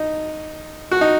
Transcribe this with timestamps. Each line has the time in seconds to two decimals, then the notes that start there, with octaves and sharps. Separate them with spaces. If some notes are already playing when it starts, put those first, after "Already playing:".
Already playing: D#4
0.91 F#4
1.01 D#4